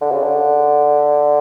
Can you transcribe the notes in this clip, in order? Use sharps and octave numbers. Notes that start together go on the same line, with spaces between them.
D3
C#3
D3